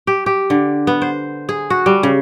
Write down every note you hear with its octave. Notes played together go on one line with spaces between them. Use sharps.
G4
G4
D3
B3
C5
G#4
F#4
G3
C#3